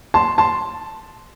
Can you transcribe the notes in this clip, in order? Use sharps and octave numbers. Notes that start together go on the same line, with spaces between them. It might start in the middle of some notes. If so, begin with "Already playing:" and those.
A5 C6
A5 C6